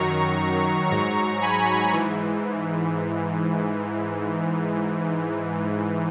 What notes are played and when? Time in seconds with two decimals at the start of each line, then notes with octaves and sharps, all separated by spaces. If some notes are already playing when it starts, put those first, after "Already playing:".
Already playing: F#2 D#3 F#3 A#5 C#6
0.90 G#2 F#3 A#5 C#6
1.41 G#5 B5
1.92 G#2 E3